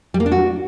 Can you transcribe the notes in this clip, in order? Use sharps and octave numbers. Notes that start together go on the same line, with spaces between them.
G3
A#3
D4
F#4